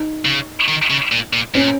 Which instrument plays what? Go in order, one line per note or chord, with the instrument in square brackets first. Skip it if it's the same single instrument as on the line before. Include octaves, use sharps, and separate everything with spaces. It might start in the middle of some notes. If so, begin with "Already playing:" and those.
Already playing: [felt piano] D#4
[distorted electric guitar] C#3
D#3
C#3
A#2
A#2
[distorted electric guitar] A#2 [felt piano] C#4